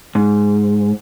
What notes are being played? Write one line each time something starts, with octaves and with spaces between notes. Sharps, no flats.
G#2